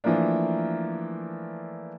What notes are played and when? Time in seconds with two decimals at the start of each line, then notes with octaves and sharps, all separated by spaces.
0.04 E3 F3 A3 A#3 D4